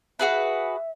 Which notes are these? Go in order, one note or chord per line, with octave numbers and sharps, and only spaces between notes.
F#4 G#4 B4 E5